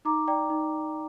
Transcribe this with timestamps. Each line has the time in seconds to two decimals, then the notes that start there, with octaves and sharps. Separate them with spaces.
0.05 D#4 A#5 D6
0.28 D5 G5 A#5
0.50 D#4